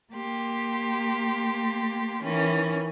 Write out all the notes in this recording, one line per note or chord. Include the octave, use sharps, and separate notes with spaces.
A#3 G4 C6
D#3 E3 C#4